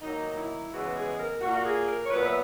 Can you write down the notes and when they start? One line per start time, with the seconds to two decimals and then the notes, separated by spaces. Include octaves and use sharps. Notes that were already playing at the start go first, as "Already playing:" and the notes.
0.02 D#3 F#3 A#3 D#4
0.36 E4
0.71 C#3 E3 G#3 B3 F#4
0.95 G#4
1.18 A#4
1.40 A#2 A#3 F#4
1.55 F#4
1.64 G#4
1.87 A#4
2.04 C#5
2.11 A#2 F#3 B3 B4
2.24 E5